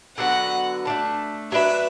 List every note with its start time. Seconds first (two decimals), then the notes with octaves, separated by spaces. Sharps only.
0.18 D3 F#3 B3 F#4 F#5
0.85 A3 D4 A4
1.52 F#3 D4 B4 E5